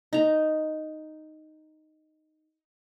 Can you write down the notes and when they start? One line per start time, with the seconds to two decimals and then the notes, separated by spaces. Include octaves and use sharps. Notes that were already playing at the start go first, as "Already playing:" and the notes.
0.13 D#4 A#5